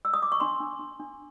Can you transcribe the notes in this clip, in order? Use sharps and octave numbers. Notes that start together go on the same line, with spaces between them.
E6
D#6
D6
C#6
D4 C6
D4
D4
D4